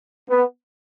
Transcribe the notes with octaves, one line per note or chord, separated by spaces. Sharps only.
B3